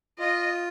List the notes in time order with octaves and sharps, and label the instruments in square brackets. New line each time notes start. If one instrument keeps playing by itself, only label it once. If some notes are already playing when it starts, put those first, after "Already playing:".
[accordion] F4 [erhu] D#5